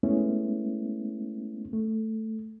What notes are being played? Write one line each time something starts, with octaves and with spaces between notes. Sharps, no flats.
G#3 A3 B3 C#4 E4
A3